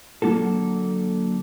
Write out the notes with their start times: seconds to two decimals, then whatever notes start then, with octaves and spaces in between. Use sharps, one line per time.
0.22 D3 F#3 A#3 F4 F#4 A4